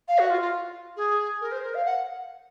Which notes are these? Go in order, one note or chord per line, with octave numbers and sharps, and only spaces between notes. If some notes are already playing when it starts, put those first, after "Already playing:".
F5
F#4
F4
F4
G#4
A#4
C5
A#4
F5
F#5